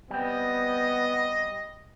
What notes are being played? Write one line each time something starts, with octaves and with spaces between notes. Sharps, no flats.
G3 B3 C4 D#5